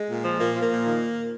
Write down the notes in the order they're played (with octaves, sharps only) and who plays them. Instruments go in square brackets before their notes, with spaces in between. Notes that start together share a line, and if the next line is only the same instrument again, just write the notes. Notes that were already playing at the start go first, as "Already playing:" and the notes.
Already playing: [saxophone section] G#3
A#2
F3
A#2 A#3
F3
A#3
A#2
D#3